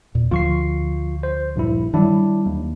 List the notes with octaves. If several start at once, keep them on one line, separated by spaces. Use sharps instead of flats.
E2 A#2
D2 F3 F4 C#6 C7
C5
A#1 G2 E4
D#3 F#3 G3 D4 E4
D#2